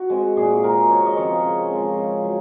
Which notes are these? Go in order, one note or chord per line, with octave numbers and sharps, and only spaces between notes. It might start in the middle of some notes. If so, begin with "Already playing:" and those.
Already playing: F#4
G#3 C4
A#2 G#4
G#3 C4 A#4
C#3 C#5
D#5
F3 G#3 C4 C#5
C#3
F3 G#3 C4
C#3
F#3